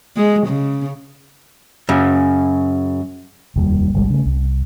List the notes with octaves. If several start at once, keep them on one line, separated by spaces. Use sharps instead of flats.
G#3
C#3
F#2 C#3
F1 D#2 G3
G1 C2 G3 G#3
C#3 A3
C2